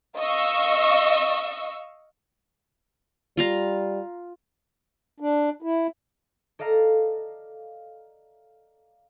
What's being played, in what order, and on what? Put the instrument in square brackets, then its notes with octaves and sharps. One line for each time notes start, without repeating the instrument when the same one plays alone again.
[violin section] D#5 F5 C#6 E6
[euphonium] G3 [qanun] F4 F5 A#5
[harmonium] D4
E4
[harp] A4 D5 D#5 F5 A#5